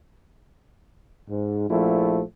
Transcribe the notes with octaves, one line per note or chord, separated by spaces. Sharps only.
G#2
A#1 F3 A3 E4